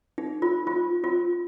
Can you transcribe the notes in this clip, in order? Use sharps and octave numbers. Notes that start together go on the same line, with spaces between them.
D#4
F4
F4
F4